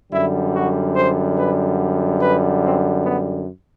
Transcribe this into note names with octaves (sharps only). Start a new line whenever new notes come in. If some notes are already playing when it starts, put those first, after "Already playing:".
F#2 D3 G3 E4
F#4
C5
B4
B4
C4
B3